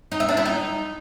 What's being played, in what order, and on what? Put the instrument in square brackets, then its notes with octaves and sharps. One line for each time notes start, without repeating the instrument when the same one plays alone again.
[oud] D#4
E5
D4
E4
D#4